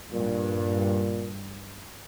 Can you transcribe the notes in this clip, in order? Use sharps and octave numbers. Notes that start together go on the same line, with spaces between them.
G2 A#2